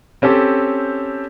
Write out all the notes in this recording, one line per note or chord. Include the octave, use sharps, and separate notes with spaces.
C4 C#4 G4 A4